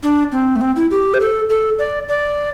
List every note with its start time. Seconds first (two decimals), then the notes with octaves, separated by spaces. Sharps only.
0.03 D4
0.32 C4
0.56 A3
0.61 C4
0.76 E4
0.91 G4
1.14 C5
1.20 A4
1.49 A4
1.79 D5
2.08 D5